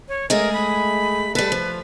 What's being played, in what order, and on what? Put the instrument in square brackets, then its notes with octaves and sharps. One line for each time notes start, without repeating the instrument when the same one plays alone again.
[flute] C#5
[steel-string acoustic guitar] G#3 A3 G#4 [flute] A#4
[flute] B5
[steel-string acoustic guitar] G3 A4 [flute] B4
[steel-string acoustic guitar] F3